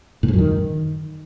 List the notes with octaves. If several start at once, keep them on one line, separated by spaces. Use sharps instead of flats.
A2
G#2
F#2
D#3